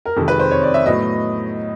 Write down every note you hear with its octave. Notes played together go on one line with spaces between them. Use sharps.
A#4
F2 C3 D#3 G#3 A4
B4
C5
C#5
D5
E5
A2 F#3 B3 D#5